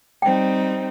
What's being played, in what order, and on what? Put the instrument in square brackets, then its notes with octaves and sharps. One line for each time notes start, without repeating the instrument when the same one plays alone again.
[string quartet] G3 C4 D#4 [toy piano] G5